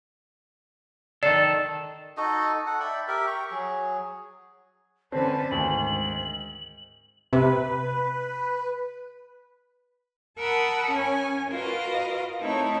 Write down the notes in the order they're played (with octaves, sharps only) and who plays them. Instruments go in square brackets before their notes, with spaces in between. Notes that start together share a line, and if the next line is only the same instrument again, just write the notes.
[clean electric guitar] D#3 A4 [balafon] D5
[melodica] D#4 F#4 A4 D#5
A4 F#5
D5 E5 G5 B5
G4 A#4 E5
G5 A#5 C#6
F#3 G#4
[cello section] D3 C#4 B4 [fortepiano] C4 [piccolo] A5
[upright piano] D2 [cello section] G#2 D#3 [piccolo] F#7
[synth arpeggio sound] C3 [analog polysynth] B4
[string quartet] A#4 F#5 A5 B5 D#6 E6
C#4 C#5 G#5
F4 F#4 A#4 B4 D#5 F5
A3 C4 D#4 E4 A4 C#5